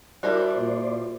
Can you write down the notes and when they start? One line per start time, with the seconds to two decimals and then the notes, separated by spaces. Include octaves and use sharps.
0.23 G3 D4 E4 F#4 A#4 C5 D5
0.57 A#2